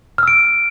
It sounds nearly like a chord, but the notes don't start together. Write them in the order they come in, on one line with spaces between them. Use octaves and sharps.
F6 E6 D7